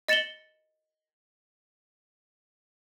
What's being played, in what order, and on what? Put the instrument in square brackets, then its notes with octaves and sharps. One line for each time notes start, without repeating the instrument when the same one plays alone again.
[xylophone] D#5 A6 C#7 E7 F#7 G7